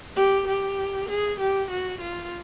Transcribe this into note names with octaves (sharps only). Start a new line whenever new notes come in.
G4
G4
G#4
G4
F#4
F4